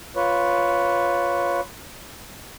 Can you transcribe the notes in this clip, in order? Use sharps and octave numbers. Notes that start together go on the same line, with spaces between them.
F4 B4 C#5